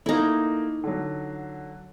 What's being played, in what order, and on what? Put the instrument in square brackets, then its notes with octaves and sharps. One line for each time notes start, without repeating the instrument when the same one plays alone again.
[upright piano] A3 A#3 [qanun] D#4 E4
[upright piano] D3 F#3